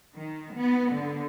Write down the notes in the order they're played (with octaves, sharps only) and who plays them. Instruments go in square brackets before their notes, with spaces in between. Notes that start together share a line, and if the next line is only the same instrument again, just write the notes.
[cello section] D#3
B3
D3